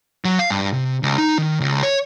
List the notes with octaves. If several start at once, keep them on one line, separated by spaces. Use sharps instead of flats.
F#3
F5
G2
C3
C#2
D#4
D#3
C#2
C#5